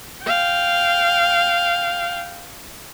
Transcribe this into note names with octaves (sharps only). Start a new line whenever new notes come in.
F5 G5